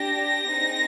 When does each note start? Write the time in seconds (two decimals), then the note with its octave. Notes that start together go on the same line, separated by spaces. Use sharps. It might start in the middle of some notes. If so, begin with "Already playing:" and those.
Already playing: D4 G4 A#6
0.49 C4 D#4 G#4